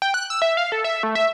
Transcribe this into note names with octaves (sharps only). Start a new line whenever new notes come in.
G5
F#6
E6
E5
F5
A4
E5
A3
E5